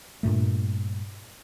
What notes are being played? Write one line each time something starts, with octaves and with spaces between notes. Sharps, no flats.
G2 A#2 A3